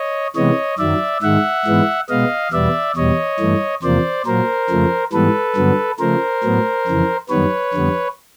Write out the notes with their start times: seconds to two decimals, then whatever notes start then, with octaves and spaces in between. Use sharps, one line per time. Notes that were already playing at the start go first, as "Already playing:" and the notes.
Already playing: C#5 D#5
0.35 C3 E3 G#3 B3 C#5 D#5
0.78 F#2 D#3 F#3 D5 E5
1.22 G#2 D#3 G#3 E5 F#5
1.65 G#2 E3 G#3 B3
2.08 B2 G#3 B3 D#5 F5
2.52 E2 B2 G3 B3 D5 E5
2.96 E2 B2 G3 C#5 D#5
3.40 G2 E3 A3
3.82 E2 C3 F3 A#3 C5 D5
4.26 A#2 F#3 A#3 A#4 C5
4.70 F2 C#3 F3 A3
5.13 G#2 E3 G3 B3 A4 B4
5.56 G2 D3 F#3 B3
5.99 C#3 F3 A3 A#4 C5
6.43 A2 F#3 B3
6.87 F2 C#3 E3
7.29 F#2 D#3 G3 B3 B4 C#5
7.74 F2 D3 G3 B3